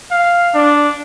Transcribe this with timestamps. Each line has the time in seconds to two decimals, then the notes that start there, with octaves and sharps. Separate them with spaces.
0.11 F5
0.54 D4